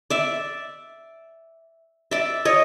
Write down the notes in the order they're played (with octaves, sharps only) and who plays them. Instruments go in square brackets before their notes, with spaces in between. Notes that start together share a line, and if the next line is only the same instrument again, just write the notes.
[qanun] D5 E5
D5 E5
C#5 D#5